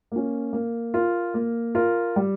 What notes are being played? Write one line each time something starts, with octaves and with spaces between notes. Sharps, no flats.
A#3 C#4
A#3
F4 A#4
A#3
F4 A#4
G3